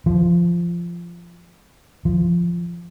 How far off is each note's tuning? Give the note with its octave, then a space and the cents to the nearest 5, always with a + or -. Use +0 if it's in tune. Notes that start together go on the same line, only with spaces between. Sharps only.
F3 -20
F3 -15